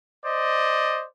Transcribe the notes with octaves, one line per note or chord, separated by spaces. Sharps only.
C5 D5 D#5